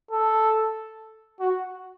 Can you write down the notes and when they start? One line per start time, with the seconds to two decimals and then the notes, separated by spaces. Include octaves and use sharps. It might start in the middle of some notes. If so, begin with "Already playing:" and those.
0.11 A4
1.40 F#4